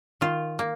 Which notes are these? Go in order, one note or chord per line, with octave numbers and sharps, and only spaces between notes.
D#3 F4
A#3